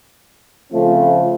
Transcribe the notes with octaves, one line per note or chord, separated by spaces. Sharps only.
C#3 F3 A3 C4 F4